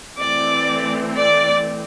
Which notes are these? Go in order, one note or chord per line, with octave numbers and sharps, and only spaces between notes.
E3 A3 C4 D5
D5